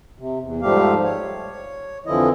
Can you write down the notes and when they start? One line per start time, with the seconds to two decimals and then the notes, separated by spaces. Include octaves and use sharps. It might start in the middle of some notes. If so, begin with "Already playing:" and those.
0.18 C3
0.41 E2
0.62 G#2 F3 G3 A3 G4 F5
1.04 C#5
2.06 F2 D3 E3 F3 E4 D#5